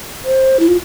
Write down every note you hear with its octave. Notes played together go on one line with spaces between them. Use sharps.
C5
E4
F4